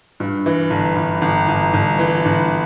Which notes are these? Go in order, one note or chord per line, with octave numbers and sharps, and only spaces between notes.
G2
E3
G1
G1
G1
G1
G1
E3
G1